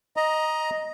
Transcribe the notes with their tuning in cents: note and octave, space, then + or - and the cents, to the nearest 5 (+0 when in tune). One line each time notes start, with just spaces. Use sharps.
D#5 +0 A#5 +15